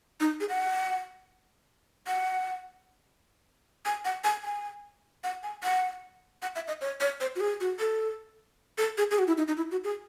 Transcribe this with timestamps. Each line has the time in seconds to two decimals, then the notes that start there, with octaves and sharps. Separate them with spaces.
0.20 D#4
0.40 G#4
0.49 F#5
2.07 F#5
3.85 G#5
4.05 F#5
4.24 G#5
4.44 G#5
5.24 F#5
5.43 G#5
5.63 F#5
6.42 F#5
6.55 E5
6.67 D#5
6.81 C#5
7.00 C#5
7.21 C5
7.36 F#4
7.40 G#4
7.61 F#4
7.80 A4
8.78 A4
8.98 G#4
9.11 G#4
9.19 F#4
9.27 E4
9.38 D#4
9.48 D#4
9.57 E4
9.71 F#4
9.84 G#4